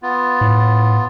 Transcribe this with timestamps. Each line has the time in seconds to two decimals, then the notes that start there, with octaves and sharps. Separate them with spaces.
0.03 B3 F4
0.41 A2